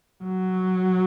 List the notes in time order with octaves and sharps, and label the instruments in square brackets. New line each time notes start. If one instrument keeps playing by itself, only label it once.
[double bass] F#3